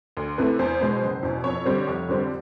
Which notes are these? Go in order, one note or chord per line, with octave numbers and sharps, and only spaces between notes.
D2
C3 E3 A3 B4
E2 C5
B2 G#3 B3
F#1
E2 B2
F2 C#5
D3 G3 C4
F1
F2 D3 G3 C4